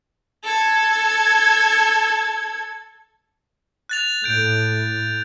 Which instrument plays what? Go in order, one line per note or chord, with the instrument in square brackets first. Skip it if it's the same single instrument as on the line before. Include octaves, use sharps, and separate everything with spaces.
[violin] A4 G#6
[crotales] F#6 A6 F7
[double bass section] A2 [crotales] G6 D7